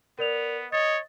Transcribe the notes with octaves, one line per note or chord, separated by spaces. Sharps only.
B3 A#4 D5 F7
C#5 D#5 A6